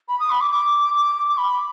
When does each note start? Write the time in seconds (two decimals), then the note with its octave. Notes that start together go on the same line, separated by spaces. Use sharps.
0.08 B5
0.20 D#6
0.30 B5
0.41 D6
0.52 D6
0.95 D6
1.28 D6
1.37 B5